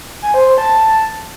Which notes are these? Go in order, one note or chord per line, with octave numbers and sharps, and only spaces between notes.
G#5
C5
C5
A5